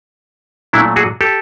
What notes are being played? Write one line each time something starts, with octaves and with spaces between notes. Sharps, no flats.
A#2 F#3 A3 D4 E4
F#4 G#4
G4 A4